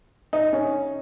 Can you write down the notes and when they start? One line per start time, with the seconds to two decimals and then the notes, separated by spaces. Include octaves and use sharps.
0.33 D#4
0.53 C#4